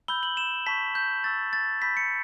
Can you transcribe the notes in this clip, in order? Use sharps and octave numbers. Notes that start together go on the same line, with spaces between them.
B5 E6 G6 G7
F#7
E7
A5 C#6 G6 B6
G6
C#6 E6 G6 A6
A6
B5 E6 G6 B6
C#7